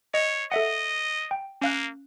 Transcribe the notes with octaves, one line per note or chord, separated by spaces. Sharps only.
C#5 D#5
A4 D#5 E5 F#5
G5
A#3 C#4 F5 F#6